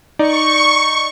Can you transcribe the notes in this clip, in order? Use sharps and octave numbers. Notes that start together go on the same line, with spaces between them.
D#4 D5 C#6